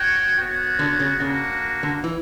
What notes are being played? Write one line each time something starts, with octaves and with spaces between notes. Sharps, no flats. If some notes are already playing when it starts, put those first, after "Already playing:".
Already playing: F#4 C#5 G5
B3 F#4 C#5
D3
C#3
C#3 A#3 D4 F#4
D3
E3